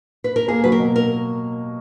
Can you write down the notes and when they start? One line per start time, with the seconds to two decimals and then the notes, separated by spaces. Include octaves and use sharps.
0.24 B4
0.36 A#4
0.48 A#3 G#4
0.64 F#3 B4
0.72 A#4
0.79 B2
0.96 A#4